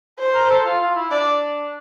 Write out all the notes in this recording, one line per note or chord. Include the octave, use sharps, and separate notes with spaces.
C5
A#4
A4
F4
F4
E4
D4 D5